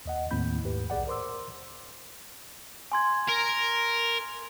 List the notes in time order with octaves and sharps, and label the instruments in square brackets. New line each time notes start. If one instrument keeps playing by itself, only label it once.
[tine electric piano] D#2 D#5 F#5
D#2 A2 D#3 C4 B5 G6
D#2 G#2 G4 B4
B1 G#4 D5 F#5
A#4 C5 C6 D6 E6
[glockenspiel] G#5 C6 G#6
[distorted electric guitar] A#4